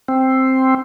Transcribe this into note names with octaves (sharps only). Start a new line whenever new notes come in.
C4